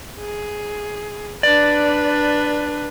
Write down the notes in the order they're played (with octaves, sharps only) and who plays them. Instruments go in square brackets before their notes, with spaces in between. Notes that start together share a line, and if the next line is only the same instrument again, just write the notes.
[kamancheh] G#4
[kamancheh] D4 B4 [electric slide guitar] D5